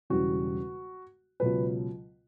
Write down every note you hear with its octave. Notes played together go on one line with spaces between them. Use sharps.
E1 E2 C#3 G3 F#4
C#2 B2 F#3 B4